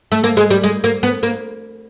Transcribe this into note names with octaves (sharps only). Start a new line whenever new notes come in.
A3
A#3
G#3
G3
G#3
A#3
B3
A#3